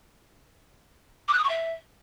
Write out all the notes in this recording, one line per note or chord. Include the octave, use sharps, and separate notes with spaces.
D6
F#6
D#6
C#6
E5